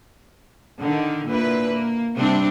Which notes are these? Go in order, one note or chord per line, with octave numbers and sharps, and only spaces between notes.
D3 D#3
A#2 D3 A#3 E4 B4
A#3
C3 G3 C4 D4